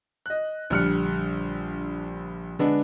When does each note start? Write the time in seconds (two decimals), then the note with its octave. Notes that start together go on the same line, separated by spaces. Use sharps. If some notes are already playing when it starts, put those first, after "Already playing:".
0.26 D#5 F#6
0.70 A#1 D3 G3 F6 F#6 C#7
2.59 D3 G#3 B3 D4